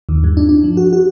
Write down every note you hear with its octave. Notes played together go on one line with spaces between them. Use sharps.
D#2
G2
D4
D4
F3
F#4
F#4